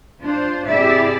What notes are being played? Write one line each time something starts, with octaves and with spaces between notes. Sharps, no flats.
D4 F4 C5
C3 E4 G4 G#4 D5 E5